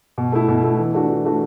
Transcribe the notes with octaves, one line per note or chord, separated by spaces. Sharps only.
B2
A3 E4
B2
A3 E4
E3
A3 D4 F#4
E3
A3 D4 F#4